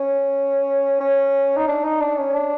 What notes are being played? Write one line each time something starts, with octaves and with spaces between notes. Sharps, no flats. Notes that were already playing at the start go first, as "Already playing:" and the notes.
Already playing: C#4
C#4
D#4
D4
D#4
D4
C#4
D4